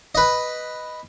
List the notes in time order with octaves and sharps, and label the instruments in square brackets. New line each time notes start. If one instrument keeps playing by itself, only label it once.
[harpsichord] B4 D#5